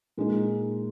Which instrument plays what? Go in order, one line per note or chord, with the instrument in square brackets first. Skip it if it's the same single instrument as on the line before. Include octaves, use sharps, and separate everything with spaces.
[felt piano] A#2 G#3 D#4 G#4